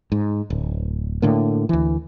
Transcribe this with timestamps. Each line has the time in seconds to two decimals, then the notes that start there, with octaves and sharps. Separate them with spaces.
0.12 G#2
0.50 D1
1.22 A2 D3 A#3
1.69 D2 E3